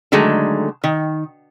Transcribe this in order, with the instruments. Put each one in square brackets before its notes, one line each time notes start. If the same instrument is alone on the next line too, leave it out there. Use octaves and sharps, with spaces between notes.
[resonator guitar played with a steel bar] D3 D#3 F#3 G#3 A3
D#3